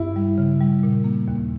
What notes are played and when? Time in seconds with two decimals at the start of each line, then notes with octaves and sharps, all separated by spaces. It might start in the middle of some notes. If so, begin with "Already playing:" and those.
Already playing: G2 E4
0.16 G3
0.38 C#3
0.60 G3
0.83 A#2
1.04 A#3
1.28 D#2